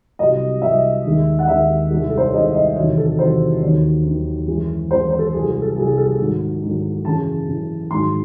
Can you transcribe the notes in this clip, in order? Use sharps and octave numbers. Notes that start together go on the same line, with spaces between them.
C2 C3 F#3 D#5
C2 C3 F#3 E5
D#2 D#3 G#3
F#5
D#2 D#3 G#3 E5
C2 C3 D#3 G#3
A4
C5
C#5
C2 C3 D#3 G#3 D#5
D#5
E2 C3 D#3 F#3 C#5
A4
E2 C3 D#3 F#3 C5
D#2 D#3 F#3 C#5
D#2 D#3 F#3
F#2 E3 G#3
F#2 E3 G#3 C5
C5
A4
C2 C3 F#3 G#4
G#4
A4
C2 C3 F#3 G#4
A4
G#2 D#3 F#3
G#2 D#3 F#3
F#2 C#3 E3 A5
F#2 C#3 E3
G#2 D#3 F#3 C6